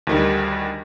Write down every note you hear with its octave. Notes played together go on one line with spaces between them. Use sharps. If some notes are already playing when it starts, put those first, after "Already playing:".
D2 D#3 G3